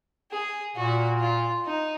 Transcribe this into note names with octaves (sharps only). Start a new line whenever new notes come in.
G#4
A#2 F#4
F4
D#4